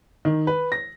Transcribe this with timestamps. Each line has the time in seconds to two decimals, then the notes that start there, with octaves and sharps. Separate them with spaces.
0.25 D#3
0.47 B4
0.72 A#6